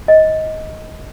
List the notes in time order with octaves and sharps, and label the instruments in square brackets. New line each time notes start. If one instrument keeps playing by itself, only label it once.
[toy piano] D#5